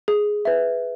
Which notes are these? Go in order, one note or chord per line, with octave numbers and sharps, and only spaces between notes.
G#4
B4 E5